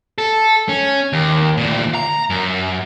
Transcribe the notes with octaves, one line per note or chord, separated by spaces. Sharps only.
A4
C#4
D#2
D2 A#2
A#5
F#2